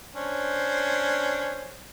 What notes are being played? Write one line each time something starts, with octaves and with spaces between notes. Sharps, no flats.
C#4 D4 C5